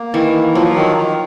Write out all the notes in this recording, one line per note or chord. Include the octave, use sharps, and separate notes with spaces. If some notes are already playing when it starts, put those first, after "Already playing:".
Already playing: A#3
D#3 E3
A#3
F3 F#3
D#3
D#3